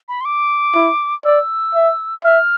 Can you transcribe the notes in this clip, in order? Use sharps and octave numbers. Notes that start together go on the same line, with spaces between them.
B5
C6
D6
E4
D5 E6
E5
E5 F6